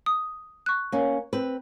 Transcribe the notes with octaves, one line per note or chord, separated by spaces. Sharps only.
D#6
C#6 F#6
A#3 C#4
C4 B4